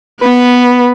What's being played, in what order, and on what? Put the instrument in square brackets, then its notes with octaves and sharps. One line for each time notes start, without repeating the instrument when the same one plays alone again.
[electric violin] B3 B4